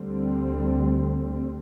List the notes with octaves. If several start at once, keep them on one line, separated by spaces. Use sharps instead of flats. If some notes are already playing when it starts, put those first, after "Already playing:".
Already playing: D2 D3 G3 C4